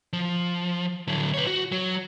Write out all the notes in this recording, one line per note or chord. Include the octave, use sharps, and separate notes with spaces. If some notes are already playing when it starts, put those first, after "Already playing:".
F3
D3 F#3
B4 C#5
F#4
F#3